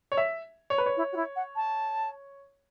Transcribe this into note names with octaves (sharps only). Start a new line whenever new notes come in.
C#5
E5
C#5
B4
C#5
E4
F#4
E4
F#5
A5